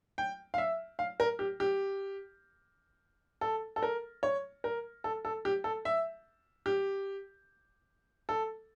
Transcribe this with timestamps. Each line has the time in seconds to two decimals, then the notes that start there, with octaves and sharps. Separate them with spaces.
0.18 G5
0.54 F5
0.58 E5
0.99 F5
1.20 A#4
1.39 G4
1.60 G4
3.41 A4
3.76 A4
3.83 A#4
4.23 C#5
4.64 A#4
5.04 A4
5.25 A4
5.45 G4
5.64 A4
5.85 E5
6.66 G4
8.29 A4